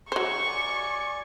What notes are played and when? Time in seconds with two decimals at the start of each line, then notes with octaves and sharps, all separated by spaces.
0.12 F#3 C5 C#5 C#6
0.47 D5 G#5